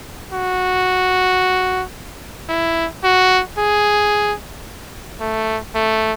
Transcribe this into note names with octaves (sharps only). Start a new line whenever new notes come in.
F#4
E4
F#4
G#4
A3
A3